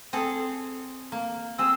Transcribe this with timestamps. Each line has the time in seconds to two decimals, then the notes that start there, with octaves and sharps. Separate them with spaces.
0.13 C4 G#4 A4
1.12 A#3
1.58 C4 G#4 E6